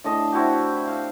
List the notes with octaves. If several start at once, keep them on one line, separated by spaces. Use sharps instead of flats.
A2 D4 D#5 A5
C4 E4 F#4 G4
F5